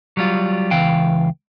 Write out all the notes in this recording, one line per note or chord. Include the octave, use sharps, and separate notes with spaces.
F#3 G3 F4
C#2 E3 F5 G5